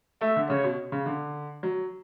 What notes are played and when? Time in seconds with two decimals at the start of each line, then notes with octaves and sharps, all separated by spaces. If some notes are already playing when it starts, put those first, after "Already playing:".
0.21 A3 E5
0.36 D3
0.50 C#3 C#5
0.64 B2
0.92 C#3
1.06 D3
1.63 F#3